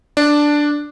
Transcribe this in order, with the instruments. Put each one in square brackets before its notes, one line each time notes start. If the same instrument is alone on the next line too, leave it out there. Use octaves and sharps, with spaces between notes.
[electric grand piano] D4